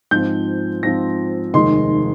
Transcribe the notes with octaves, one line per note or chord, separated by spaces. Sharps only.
G#2 F3 C4 F4 G6
G#2 F3 C4 F4 A#6
F1 D#2 D#3 G#3 D#4 C6